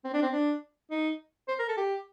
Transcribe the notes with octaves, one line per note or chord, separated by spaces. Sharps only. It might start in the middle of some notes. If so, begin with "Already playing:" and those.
C4
D4
C4
D4
D#4
C5
A#4
A4
G4